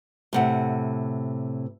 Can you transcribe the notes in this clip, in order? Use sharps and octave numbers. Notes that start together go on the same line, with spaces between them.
A2 C3 F#5